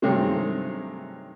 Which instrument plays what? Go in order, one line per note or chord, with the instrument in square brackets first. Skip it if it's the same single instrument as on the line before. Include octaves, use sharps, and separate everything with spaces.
[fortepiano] G2 C3 D#3 F#3 G#3 A3